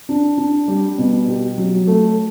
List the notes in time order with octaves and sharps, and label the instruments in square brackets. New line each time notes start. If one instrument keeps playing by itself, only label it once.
[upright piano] D4
D4
G3
B2
G4
F#3
A3